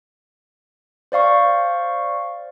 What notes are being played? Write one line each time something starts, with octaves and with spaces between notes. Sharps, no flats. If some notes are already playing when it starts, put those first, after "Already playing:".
C5 D5 F5 C#6